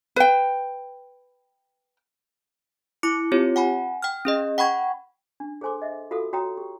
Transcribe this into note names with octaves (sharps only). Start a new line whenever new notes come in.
B4 G5
E4 D6 C#7
C4 F4 G4 C#5
F#5 G#5 B5
G5 F6
C#4 G#4 D#5
F#5 G5 B5 C#6 G#6
D4
G#4 A4 C5 G#5 C6 D6
D#5 E5
F4 F#4 A4 F5 D#6
F#4 C#5 G5 A#5 D#6
G4